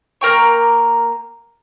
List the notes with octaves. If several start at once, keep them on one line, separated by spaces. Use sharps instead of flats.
A#3 A#4 G5 C#6